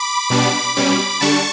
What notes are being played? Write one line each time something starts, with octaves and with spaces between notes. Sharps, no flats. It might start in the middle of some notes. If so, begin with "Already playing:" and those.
Already playing: B5 D6
B2 G3 B3 D4
B2 G3 C#4 B5 D6
D3 G3 D4 A5 C#6